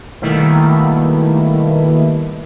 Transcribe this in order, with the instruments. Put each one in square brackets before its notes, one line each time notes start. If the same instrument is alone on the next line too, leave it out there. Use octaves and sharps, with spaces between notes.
[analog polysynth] B2 D#3 G3 A3 A#3 E4